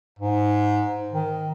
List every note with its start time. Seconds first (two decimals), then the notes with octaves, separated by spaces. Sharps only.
0.19 G#2
1.12 D#3